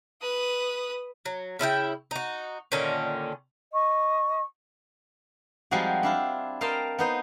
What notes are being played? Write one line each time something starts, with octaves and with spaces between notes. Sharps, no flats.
B4 D#6
F#3
C#3 E4 A4 G5
D#4 F#4
A#2 D3 D#3 C#4
D#5 C#6
F3 G3 G#3 C4 D#4 F#4
D4 E4 F4
A#4 D#5 F5 G5 A5 C6
B3 D#4 C5